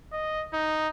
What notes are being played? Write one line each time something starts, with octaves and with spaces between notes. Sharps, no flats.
D#5
D#4